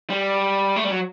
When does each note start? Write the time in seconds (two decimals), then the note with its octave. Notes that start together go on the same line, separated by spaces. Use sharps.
0.10 G3
0.76 A3
0.84 G3
0.91 F#3